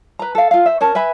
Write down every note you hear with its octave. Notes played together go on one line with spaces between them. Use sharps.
B4 A#5
A4 F5
F4 F5
C5 E5
C#4 A#4 C#5 A5
B4 E5 G#5 B5